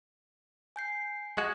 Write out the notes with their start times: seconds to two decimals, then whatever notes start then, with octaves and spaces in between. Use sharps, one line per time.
0.76 G#5 G6 C7
1.38 G#3 F#4 D#6 G#6